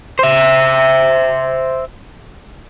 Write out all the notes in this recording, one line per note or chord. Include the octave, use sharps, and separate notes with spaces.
C5 E5